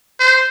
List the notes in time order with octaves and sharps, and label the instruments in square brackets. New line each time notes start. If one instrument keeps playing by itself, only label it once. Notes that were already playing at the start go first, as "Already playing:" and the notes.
[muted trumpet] C5